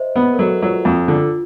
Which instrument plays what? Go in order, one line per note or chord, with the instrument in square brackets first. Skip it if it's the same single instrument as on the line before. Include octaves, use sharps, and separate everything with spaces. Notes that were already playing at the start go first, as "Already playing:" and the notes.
Already playing: [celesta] C5 D#5 E5
[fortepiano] B3 [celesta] B4
[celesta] A#4
[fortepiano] F#3 [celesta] A4
[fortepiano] F#3 [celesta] F4
[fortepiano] F2 [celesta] F4
[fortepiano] D3 [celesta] F4